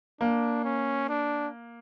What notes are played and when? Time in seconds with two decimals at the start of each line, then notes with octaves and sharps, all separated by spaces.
0.21 A#3 D4
0.65 C#4
1.09 D4